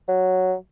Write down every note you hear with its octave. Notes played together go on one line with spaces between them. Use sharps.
F#3